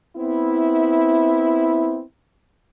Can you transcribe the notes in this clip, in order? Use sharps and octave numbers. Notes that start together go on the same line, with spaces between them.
B3 C4 E4